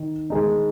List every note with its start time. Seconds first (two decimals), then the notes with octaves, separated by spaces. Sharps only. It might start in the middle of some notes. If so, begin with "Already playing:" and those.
Already playing: D#3
0.30 D#3 G#3 D#4